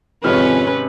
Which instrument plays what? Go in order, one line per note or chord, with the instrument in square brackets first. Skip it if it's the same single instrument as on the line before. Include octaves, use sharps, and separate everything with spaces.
[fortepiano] G#1 C3 F6 [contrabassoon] F2 [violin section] C#4 [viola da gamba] B4